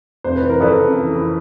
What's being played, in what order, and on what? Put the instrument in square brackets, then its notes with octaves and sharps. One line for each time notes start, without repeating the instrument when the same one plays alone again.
[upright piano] F1 C5
B4
E3
A#4
F2 A4 B4
C#3
E3
E3